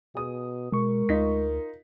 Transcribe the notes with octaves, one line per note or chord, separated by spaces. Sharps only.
B2 G#4 D#6
B2 G#3 A#4 C#6
D2 D#4 F4 B6